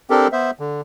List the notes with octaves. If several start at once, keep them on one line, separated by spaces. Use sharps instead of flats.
C4 D4 G4 A4 A#4
B3 C5 E5
D3